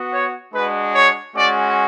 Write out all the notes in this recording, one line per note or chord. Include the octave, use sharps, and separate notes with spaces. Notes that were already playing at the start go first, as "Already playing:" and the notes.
Already playing: B3 F#4
C#5
G#3 D4 F#4 B4
C#5
G#3 C#4 F#4 D5